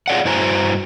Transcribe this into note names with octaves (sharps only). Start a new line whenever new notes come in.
F4 G#4 C#5 D5 F5 F#5
G2 E4 F#4 C5 G#5 A#5